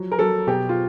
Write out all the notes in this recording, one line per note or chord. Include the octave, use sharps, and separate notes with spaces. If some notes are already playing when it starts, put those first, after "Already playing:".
Already playing: F3 F#3
A#4
F#3 A4
B2 G4
F4